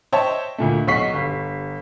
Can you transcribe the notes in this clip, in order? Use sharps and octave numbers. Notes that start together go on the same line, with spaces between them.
C5 C#5 D#5 E5 G5 A5
D2 A#2 A3
B1 D#5 F#5 C#6 B6 C7
G1